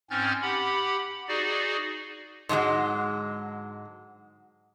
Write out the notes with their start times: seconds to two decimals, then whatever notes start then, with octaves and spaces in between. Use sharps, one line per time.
0.10 G#2 C4 C#4 F6 G6 A6
0.42 G4 F#5 B5
1.28 D#4 F#4 G#4 D5
2.49 G#2 D3 F#3 G#3